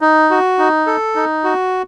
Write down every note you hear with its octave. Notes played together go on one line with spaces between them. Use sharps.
D#4
F#4
D#4
A4
D#4
F#4